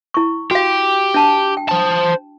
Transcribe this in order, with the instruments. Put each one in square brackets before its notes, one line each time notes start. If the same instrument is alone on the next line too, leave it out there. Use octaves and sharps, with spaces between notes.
[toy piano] E4 C#6
[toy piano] F#4 F5 [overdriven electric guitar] G4
[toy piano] D4 A5
G5
[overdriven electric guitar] C5 A5